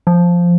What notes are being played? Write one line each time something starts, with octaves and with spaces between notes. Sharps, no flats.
F3